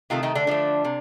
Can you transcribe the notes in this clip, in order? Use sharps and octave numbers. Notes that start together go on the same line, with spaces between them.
C3 D#3 A3 F4
D#3 D#4
D3 D4
D3 F3 A3
C3